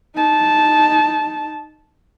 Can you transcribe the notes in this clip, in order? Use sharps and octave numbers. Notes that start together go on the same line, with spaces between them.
D#4 A5